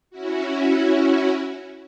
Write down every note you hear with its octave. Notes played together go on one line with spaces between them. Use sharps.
C#4 E4 F#4